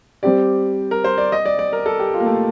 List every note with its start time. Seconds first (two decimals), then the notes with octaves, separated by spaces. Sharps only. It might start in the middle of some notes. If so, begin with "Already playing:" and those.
0.23 G3 C4 G4 D5
0.91 A#4
1.04 C5
1.18 D5
1.32 D#5
1.46 D5
1.59 D5
1.73 A#4
1.86 A4
2.00 G4
2.14 F4
2.20 A#3
2.26 A3